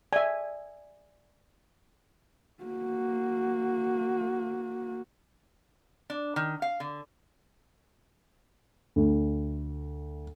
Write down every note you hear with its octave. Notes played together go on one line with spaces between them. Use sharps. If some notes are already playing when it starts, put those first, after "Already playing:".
D5 E5 G#5
A#3 F#4
D4
D#3
F5
D3
D2